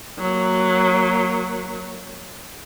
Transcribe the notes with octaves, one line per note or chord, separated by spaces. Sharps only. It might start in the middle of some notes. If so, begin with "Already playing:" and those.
F#3 A#3